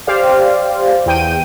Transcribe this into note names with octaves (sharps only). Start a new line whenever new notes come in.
G4 C5 D5 F5
E2 G5 D#7